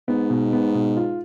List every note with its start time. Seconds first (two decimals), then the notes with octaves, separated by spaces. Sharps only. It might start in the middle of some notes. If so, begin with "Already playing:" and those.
0.08 G#2 B3
0.30 B2
0.53 B3
0.75 B2
0.97 F4